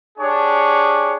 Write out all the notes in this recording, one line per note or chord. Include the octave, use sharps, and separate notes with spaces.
D4 G4 G#4 C#5